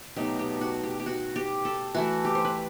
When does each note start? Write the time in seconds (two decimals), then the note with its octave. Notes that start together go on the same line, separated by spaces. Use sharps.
0.16 B2 F#3 A3 D#4 G4
0.39 G4
0.61 F#4
0.84 G4
1.00 G4
1.06 F#4
1.36 G4
1.65 A4
1.95 E3 A3 E4 F#4
2.25 G4
2.35 C5
2.45 B4